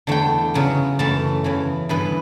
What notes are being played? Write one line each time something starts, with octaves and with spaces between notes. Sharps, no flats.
E2 D3 A3 G5
C#3 F#3 B3
F#2 E3 A3 A5
E2 C#3 E3
G2 E3 B3 B4